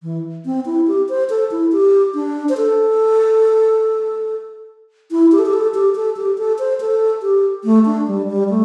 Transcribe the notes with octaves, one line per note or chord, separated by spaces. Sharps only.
E3
C4
E4
G4
C5
A4
E4
G4
D4
C5
A4
E4
G4
A4
G4
A4
G4
A4
G4
A4
C5
A4
G4
A3
D4
G3
G3
A3